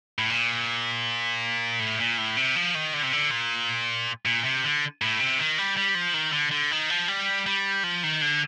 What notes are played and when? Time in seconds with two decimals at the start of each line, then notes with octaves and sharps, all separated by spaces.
0.19 A2
0.30 A#2
1.80 A2
2.00 A#2
2.18 A2
2.37 C3
2.56 F3
2.75 D#3
2.94 D3
3.03 C3
3.13 D3
3.31 A#2
4.26 A#2
4.44 C3
4.64 D3
5.02 A2
5.20 C3
5.38 D#3
5.58 G3
5.77 G3
5.95 F3
6.14 D#3
6.33 D3
6.51 D3
6.71 D#3
6.90 F3
7.08 G3
7.46 G3
7.84 F3
8.03 D#3
8.22 D3